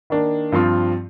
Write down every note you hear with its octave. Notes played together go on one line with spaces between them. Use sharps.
D#3 A#3 D4
G2 F3 C4 F4